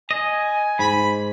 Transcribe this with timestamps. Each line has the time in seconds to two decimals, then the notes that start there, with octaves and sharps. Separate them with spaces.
0.11 D#5 G#5
0.79 G#2 B5